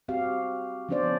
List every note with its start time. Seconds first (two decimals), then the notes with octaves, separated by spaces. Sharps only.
0.08 C4 F#4 G4 F5
0.89 F3 B3 C#4 D4 C5 D5